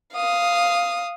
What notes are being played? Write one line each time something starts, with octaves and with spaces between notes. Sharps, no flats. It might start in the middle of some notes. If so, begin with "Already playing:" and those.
F5 D#6